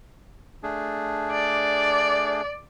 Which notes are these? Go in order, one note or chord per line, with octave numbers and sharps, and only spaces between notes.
A3 D4 G#4
D5